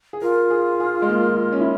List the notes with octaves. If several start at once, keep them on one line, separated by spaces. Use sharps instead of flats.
G#4
F4 A#4
G#4
G#4
G#3
A#3
C#4
E4